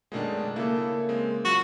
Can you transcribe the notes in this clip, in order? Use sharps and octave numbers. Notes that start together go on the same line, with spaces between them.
F#2 B2 D#3 G#3 A3 D4
C#3 A#3 E4 A4
G#3 C4
F#3 F4 F#4